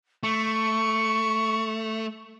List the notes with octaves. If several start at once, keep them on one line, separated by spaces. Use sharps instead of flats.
A3 C#6